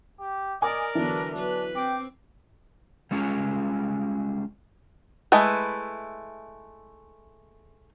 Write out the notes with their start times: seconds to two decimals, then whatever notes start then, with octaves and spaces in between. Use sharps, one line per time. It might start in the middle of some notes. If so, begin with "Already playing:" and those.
0.20 G4
0.62 A#4 D5 D#5 G#5 D6
0.95 D3 E3 F#3 B3 D4 B4
1.32 F#3 D4 B4
1.76 C4 G5 D6
3.11 G3 G#3 C#4 F4 G#4
5.32 G#3 A3 E4 B4